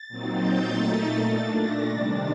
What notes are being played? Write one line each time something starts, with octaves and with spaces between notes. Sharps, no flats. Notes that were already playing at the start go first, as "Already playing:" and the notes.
Already playing: A6
A#2 F#3 C4 D#4
G6
A#2 A3 D#4 A6
A#2 A3 D4
A#6
C3 D#3 G3 D4 A6